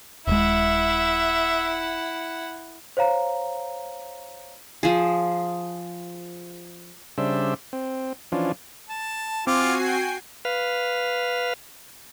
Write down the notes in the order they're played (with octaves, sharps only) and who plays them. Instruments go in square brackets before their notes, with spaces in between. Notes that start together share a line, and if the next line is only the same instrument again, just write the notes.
[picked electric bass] D#1 G#3 [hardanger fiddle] E4 F#5 [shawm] E5
[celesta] C5 C#5 F5 A#5
[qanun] F3 G#4
[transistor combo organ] C#3 G3 D4 C5 E5
C4
E3 F3 C#4 D4 F4
[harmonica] A5
[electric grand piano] C4 [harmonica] F4 D6 [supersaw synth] F#4 G#5 C7
[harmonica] G5
[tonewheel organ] B4 F5